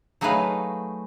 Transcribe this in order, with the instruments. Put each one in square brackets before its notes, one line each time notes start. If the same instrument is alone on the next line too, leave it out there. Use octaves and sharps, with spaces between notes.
[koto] F#3 A3 D#4 G#4 B4 F5